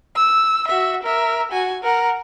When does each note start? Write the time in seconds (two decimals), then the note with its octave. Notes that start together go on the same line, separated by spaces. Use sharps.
0.16 E6
0.68 F#4 E5
1.03 A#4 E5
1.52 F#4 G#5
1.83 A#4 F#5